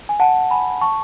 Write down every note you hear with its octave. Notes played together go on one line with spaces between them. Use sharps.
G#5
F#5 A5
G#5 B5
A5 C#6